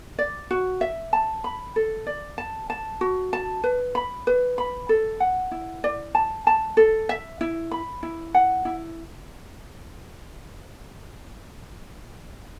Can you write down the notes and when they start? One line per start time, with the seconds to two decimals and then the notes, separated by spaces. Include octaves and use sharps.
0.19 D5
0.51 F#4
0.81 E5
1.13 A5
1.44 B5
1.76 A4
2.07 D5
2.38 A5
2.70 A5
3.01 F#4
3.33 A5
3.64 B4
3.95 B5
4.27 B4
4.58 B5
4.89 A4
5.20 F#5
5.51 E4
5.84 D5
6.15 A5
6.47 A5
6.77 A4
7.09 E5
7.41 E4
7.71 B5
8.03 E4
8.34 F#5
8.65 E4